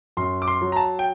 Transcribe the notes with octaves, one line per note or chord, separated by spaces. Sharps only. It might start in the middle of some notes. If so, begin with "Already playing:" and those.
F#2 C6
D6
C6
F#3
A#5
A5
G5